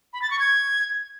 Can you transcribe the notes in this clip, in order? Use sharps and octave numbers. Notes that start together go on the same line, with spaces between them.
B5
A6
C#6
G#6